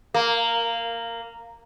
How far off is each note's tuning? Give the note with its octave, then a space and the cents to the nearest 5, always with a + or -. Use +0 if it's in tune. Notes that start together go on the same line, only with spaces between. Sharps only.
A#3 -10